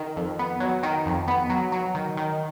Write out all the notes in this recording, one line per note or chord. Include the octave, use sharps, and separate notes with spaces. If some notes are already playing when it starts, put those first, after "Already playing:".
Already playing: D#3
F2
B3
F#3
D#3
F2
B3
F#3
F#3
D#3
D#3